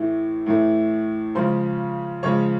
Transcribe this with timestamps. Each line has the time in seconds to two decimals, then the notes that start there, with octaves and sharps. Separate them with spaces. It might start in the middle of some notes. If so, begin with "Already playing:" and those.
Already playing: A2 E3 A3
0.46 A2 E3 A3
1.35 C#3 F3 G#3 C5 C6
2.23 C#3 F3 G#3 C#5 C#6